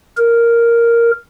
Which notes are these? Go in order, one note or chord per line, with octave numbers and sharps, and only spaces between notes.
A#4